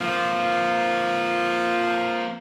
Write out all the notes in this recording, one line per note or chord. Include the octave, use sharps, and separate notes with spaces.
F3 A#3 C4